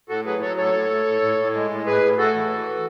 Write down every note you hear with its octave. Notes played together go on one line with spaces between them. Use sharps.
A2 F#4 A4
F#3 G#4 B4
F#3 A4 C#5
A2 A4 C#5
A2
A2
A2
A2
A2
G#3
A2
A2 G#4 B4
A2
A2 F#4 A4
E3
E3